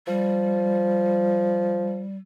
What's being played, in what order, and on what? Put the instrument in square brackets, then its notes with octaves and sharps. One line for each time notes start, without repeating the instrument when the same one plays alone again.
[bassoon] F3 [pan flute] G3